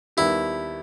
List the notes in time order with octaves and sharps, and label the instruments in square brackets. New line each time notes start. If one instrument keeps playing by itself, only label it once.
[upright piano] D#2 D#3 G3 B3 G4 [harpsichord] E4